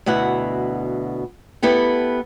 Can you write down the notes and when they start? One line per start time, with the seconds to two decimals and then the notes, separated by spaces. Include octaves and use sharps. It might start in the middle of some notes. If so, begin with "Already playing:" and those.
0.06 D2 B2 E4 F#5
1.63 B3 E4 G4 A4